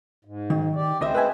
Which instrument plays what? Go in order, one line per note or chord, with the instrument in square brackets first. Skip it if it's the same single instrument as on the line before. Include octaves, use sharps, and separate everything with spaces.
[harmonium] G#2
[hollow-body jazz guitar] D#3
[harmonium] G4 D5
[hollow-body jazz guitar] C#2 D#5 E5 [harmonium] G#3 C4 C5
[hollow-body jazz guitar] B4 E5 G#5